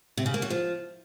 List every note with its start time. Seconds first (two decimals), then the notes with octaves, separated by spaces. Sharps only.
0.17 C3
0.26 C#3
0.34 A#3
0.42 F#3
0.50 F3